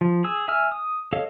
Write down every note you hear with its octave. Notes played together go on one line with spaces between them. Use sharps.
F3
G#4 E6
E5 G#5 E6 F6
D#6
A4 C#5 D#5 F5